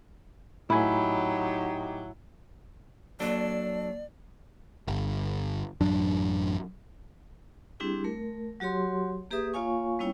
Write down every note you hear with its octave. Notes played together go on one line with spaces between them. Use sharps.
A2 F#3 D#4 E4 G4 G#5
A#1 F#3 D4 A4 D5 D6
G1
A1 F#2 F#3 D4
G3 C4 D4 E4 G4 G#4
A3 A#4
F#3 F#4 G4 C#5 C6
A#3 G4 G#4 B4 E5 D#6
A#3 F4 C#5 F5 G#5 C#6
G3 B3 C#4 E4 C#5 G5